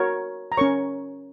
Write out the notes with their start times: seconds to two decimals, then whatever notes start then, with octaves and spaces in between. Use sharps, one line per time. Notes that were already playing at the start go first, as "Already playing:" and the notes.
Already playing: F#4 A#4 C#5
0.52 A#5
0.57 C#4 A#4 C#5 C#6